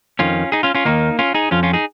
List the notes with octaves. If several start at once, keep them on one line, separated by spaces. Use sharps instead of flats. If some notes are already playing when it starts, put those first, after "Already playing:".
F2 D#3 C#4 F4
D#4 G#4
C#4 F4
C#4 F4
D#2 D#3 A#3 D#4
C#4 F4
D#4 G#4
F2 F3 C#4 F4
C#4 F4
D#4 G#4